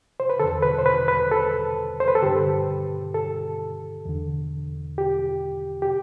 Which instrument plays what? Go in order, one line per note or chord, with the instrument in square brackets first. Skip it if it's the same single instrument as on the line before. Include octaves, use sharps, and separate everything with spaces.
[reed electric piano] C5
B4
E2 D3 A4
B4
C5
B4
B4
A4
C5
B4
A4
G2 D3 G4
A4
E2 D3
G4
G4